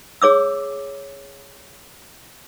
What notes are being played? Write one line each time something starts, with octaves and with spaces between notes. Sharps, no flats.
G#4 C#5 D6 E6